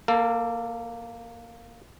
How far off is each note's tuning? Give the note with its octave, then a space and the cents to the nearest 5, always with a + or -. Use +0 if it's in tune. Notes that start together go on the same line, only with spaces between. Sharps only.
A#3 +0 A4 +35